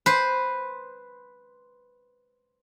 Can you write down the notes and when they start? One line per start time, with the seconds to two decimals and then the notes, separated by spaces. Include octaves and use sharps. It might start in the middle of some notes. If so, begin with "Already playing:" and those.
0.06 B4 C5